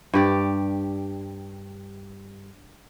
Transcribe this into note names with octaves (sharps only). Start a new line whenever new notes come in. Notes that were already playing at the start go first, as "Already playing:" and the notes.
G2 G4 D5